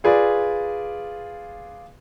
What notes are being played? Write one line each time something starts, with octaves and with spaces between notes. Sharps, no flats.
F4 G#4 B4 D5